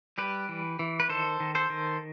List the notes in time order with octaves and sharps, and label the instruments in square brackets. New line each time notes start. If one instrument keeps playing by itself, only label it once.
[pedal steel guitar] G3 G4 B4
E3
E3
B4
D#3 A4 C5
D#3
A4 C5
D#3